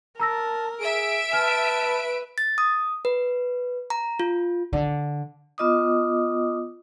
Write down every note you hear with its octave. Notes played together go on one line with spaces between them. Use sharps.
A#4 A5 A#5 E6 A#6
G#4 E5 D7
B4 A5 F6
A6
D#6
B4
A#5
F4
D3
B3 F4 D#5 D6 D#6